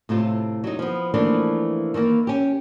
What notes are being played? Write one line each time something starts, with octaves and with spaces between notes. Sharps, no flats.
A2 C3 A3 F4
F#3 D#4
F3 B3
E3 F3 A3 A#3 D4 F4
D#3 E3 A3 A#3
C#4 G4